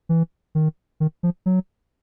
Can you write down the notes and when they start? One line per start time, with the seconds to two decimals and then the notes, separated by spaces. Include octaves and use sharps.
0.09 E3
0.55 D#3
1.00 D#3
1.23 F3
1.46 F#3